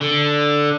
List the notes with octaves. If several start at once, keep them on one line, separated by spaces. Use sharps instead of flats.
D3